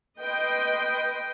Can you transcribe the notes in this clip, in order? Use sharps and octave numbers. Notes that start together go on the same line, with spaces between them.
B4 D#5 G5 C6